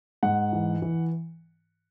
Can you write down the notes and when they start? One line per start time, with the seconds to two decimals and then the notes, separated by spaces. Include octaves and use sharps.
0.23 G#2 F#5
0.53 E3
0.82 E3